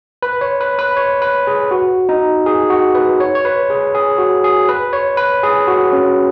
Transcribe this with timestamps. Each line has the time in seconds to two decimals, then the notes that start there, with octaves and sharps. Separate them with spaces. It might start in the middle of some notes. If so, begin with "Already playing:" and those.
0.23 B4
0.41 C#5
0.61 B4
0.79 B4
0.97 C#5
1.22 B4
1.47 G#4
1.71 F#4
2.09 D#4
2.46 G#4
2.70 F#4
2.95 B4
3.20 C#5
3.35 C#5
3.45 B4
3.70 G#4
3.95 G#4
4.18 F#4
4.44 G#4
4.69 B4
4.93 C#5
5.17 B4
5.43 G#4
5.67 F#4
5.93 C#4